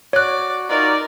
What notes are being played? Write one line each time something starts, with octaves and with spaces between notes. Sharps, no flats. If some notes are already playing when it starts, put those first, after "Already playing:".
F#4 C#5 D5 F#6
D#4 F4 F#4 A#4 D5